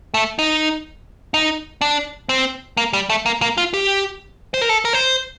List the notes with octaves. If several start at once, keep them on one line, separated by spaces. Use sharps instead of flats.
A3
D#4
D#4
D4
C4
A#3
G3
A3
A#3
A#3
F4
G4
C5
A#4
A4
A#4
C5